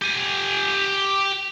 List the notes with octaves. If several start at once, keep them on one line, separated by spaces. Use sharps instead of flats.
G4 G#5